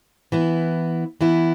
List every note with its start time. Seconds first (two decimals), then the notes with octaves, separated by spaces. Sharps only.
0.32 E3 B3 E4
1.21 E3 B3 E4